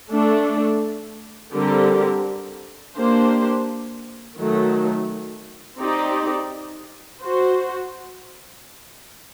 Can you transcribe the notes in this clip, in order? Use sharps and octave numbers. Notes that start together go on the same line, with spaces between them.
A3 D4 A4
D3 G3 C4 G4 A#4
A#3 D4 G4 C5
D#3 F#3 A3
C4 D#4 G4 D5
F#4 C5